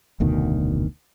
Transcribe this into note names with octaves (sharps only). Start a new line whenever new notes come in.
F1 D2 B2 D#3